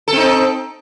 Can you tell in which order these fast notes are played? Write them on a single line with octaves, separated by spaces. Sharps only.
A4 C4 D#4